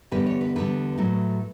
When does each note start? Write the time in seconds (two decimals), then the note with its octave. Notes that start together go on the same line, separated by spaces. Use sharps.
0.12 E2 D3 G3 B3 B4
0.26 C#5
0.41 B4
0.56 E2 D3 G3 B3 B4
0.98 A2 F#3 A3